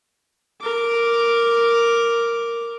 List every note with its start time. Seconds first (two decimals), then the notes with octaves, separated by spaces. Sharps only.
0.61 A#4 D6